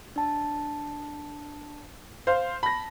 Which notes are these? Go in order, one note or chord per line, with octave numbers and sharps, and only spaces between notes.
D4 A5
C5 F5
A5 B5 A#6